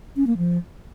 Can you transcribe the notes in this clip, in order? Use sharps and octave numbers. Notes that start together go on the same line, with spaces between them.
C#4
A#3
F3